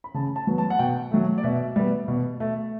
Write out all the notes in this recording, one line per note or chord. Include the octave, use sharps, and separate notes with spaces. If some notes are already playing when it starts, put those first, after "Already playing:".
B5
C#3 A5
A5
F#3 B3
A5
F#5
B2 G5
F#3 A3
D5
B2 E5
G3 B3
B2
A3